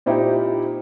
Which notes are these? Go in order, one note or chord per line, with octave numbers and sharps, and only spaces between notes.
A#2 C4 D#4 E4 G4